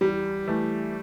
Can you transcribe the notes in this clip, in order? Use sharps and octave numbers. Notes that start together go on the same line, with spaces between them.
E2 G3
E3 A3